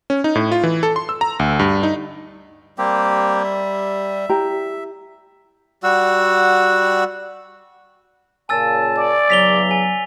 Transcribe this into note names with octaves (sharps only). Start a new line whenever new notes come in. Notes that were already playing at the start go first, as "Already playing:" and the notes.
C#4
D#4
A2
F4
E3
A4
C6
E6
A#5
D2
G2
D#4
G3 A#3 C4 G4
E5
E4 G4 A#5
G3 F#4 F#5 E6
A#2 C#3 G#5 A5 E6 A6
D5
E2 C#3 F#3 B6 F7 G7
G#5